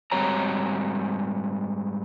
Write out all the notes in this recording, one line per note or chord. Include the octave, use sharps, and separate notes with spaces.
G#2 G3 C4 F#4 C#5 A#5